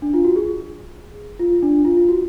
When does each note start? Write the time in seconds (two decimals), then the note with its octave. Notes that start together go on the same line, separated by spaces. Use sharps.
0.02 D4
0.14 F4
0.25 F#4
0.36 G#4
1.39 F4
1.63 D4
1.85 F4
1.97 F4
2.09 F#4